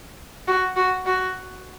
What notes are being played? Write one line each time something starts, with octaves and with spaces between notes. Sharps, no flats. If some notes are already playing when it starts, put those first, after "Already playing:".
F#4
F#4
F#4